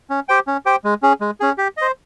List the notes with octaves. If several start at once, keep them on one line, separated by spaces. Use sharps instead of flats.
C#4
G4 C5 G5
C#4
G4 C5 G5
G#3
C#4 G#4
G#3
C#4 G#4
G4
C5 D#5